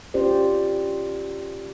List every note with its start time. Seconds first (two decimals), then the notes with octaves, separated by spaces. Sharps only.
0.14 C#4 F4 G4 C5 D5